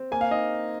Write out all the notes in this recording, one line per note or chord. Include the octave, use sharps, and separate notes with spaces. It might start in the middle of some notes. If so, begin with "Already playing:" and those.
Already playing: C4
A#3 G#5
F5
D#4 D#5